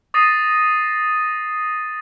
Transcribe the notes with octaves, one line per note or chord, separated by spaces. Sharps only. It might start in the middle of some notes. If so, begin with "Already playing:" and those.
D6 D#6 A6 A#6 C7 D#7